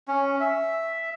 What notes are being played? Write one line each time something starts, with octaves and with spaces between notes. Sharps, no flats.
C#4
E5